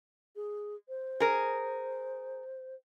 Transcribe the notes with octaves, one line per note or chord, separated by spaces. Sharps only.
G#4
C5
G#4 A#4